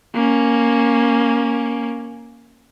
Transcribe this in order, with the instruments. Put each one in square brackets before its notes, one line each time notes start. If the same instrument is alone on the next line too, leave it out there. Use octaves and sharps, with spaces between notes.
[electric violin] A#3 C#4